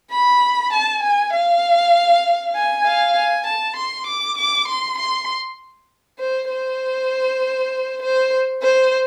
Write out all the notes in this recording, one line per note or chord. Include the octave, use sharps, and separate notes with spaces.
B5
A5
G#5
F5
G#5
F5
G#5
A5
C6
D6
D6
C6
C6
C5
C5
C5
C5